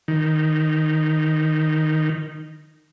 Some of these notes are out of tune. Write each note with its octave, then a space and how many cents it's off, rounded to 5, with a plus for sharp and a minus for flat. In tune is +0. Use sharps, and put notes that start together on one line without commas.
D#3 -5